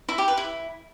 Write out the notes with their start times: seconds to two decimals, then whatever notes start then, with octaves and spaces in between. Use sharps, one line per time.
0.09 E4
0.18 G4
0.28 B4
0.37 E4